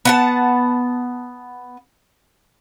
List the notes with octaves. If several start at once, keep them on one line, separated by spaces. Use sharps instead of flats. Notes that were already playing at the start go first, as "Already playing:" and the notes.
B3 F#5 A5